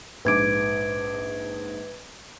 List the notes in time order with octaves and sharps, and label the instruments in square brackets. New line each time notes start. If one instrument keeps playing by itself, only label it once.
[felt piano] A#1 G#2 D6 [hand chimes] B4 G#6 D7